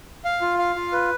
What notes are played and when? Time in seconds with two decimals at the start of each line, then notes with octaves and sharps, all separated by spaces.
0.25 F5
0.41 F4
0.59 F5
0.76 F4
0.92 B4